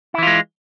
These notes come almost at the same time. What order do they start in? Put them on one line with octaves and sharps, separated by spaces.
E4 E3 F4 G#3